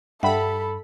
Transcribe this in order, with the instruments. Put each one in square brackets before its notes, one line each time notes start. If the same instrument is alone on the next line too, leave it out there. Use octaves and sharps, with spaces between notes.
[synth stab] G2 B5 [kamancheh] A4 [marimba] E5 F#5 G5